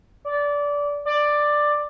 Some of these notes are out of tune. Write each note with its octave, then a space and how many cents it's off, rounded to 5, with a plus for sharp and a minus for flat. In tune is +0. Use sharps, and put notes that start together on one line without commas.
D5 -20
D5 +10